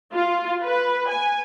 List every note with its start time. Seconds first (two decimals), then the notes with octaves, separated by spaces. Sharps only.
0.13 F4
0.63 B4
1.09 G#5